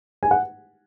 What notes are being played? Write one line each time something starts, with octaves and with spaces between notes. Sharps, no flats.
G#5
F#5